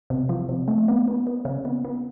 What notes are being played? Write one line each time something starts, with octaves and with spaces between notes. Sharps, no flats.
C3
F3
C3
A3
B3
B3
B3
C#3
B3
B3